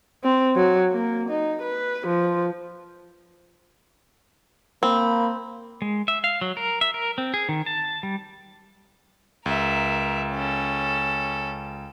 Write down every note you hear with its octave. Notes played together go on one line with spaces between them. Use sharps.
C4
F#3
A#3
D#4
B4
F3
A#3 C4 B5
G#3
E5
F5
F#3
A#4
E5
A#4
C4
G#4
D#3
A5
G3
C#2 A#4 E5
C#4 A4